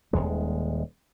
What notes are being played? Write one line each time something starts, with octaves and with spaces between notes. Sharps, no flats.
D#1 G#1 D#2 G#3